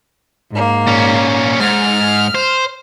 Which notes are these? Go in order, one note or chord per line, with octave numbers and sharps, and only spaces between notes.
G#2 A#3
A#2 C#4
G#2 F6
C5